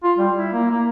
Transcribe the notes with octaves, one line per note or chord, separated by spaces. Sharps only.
F4
G3
E4
A#3
A#3